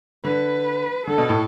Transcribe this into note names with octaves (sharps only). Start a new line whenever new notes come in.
D3 B4
D3 A4
B2
A2